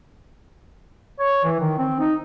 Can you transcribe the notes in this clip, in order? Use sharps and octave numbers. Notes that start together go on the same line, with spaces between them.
C#5
E3
D#3
C4
D#4